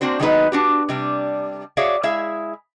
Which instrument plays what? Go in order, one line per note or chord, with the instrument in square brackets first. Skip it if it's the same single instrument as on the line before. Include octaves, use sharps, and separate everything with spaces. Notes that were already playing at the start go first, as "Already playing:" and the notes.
[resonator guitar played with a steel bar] A#3 C4 D4 F#4 C5
D#3 F#3 G#3 B3 D#4 B4
D4 F#4 G4
C3 G3 D4
F#4 G#4 C#5 D5 E5 F5
G#3 E4 G#4 E5 F5